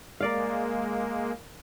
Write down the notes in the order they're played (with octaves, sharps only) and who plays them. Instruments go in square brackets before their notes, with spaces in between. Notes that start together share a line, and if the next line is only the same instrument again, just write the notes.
[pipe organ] G#3 A#3 [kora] A#4 D5 F5